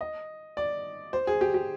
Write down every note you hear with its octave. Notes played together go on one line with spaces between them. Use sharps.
D#5
D5
C5
G#4
G4
G4